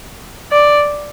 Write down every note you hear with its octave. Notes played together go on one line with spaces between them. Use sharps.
D5